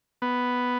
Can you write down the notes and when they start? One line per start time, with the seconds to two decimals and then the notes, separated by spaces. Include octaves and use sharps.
0.22 B3